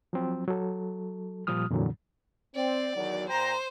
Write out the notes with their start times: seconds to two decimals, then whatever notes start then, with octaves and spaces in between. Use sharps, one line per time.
0.13 F3 F#3 C4
0.47 F#3 A4
1.47 A#2 F3 G3 D#6 F6
1.71 F2 A#2 D3 E3 F#3
2.55 C4 D5
2.96 E2 D#3 F#3
3.29 A#2 C5 G5 A#5